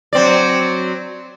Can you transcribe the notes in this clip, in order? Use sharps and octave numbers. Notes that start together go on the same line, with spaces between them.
F#3 C4 D5